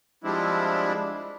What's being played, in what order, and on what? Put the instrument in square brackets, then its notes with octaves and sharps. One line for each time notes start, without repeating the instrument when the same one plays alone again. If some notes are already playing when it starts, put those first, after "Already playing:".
[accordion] F3 G3 G#3 C4 D4 E4